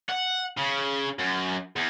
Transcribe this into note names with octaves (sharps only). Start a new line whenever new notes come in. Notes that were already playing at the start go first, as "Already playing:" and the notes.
F#5
C#3
F#2
E2